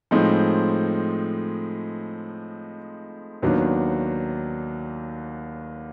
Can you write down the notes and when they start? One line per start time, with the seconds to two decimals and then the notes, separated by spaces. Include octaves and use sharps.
0.11 A2 F3 G#3 C4 D#4
3.42 D#2 D#3 F#3 B3 D4